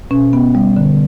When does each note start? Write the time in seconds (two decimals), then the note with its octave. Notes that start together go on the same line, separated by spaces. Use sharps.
0.11 B2 C#4
0.33 B3
0.55 G3
0.77 D3